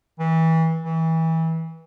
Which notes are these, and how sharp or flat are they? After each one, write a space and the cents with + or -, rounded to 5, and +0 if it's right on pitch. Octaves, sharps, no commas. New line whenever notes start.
E3 -25
E3 -25